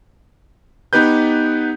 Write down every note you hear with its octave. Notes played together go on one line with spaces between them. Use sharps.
B3 D#4 G4 B4 G6